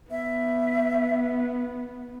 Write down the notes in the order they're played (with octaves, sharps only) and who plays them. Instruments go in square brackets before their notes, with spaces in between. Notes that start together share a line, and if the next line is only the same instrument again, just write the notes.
[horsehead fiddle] B3 [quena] E5